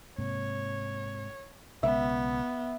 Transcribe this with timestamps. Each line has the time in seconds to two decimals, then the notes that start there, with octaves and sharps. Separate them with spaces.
0.18 G#2 C3 A#3 C#5
1.83 B1 C#3 G#3 B3 E5